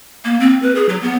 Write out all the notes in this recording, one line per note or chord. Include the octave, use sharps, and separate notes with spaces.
A#3
C4
B4
G#4
F#3
B3